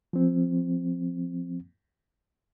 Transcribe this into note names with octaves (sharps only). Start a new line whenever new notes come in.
F3 C4